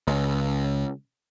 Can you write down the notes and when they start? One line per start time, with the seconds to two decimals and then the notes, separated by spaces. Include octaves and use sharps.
0.07 C#2